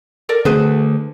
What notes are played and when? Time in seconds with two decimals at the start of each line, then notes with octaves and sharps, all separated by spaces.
0.29 A4 A#4 D5
0.45 D3 A3 G#4 B4 C5